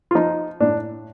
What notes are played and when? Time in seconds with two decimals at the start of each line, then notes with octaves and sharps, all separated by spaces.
0.11 F4
0.15 F3 D#4
0.60 A2 D4